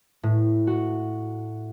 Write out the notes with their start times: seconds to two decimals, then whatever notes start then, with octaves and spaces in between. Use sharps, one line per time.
0.23 A2
0.67 F#4